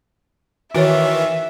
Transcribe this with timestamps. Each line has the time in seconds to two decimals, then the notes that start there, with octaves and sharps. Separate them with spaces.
0.75 D#3 E3 F#4 C#5 E5